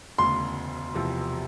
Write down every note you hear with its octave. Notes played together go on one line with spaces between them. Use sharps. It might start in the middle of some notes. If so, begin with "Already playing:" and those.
E1 D2 C#3 C6
E1 E2 C3 F3